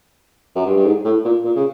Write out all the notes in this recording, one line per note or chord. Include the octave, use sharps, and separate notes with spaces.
F#2
G2
G2
G#2
A2
A#2
A#2
C#3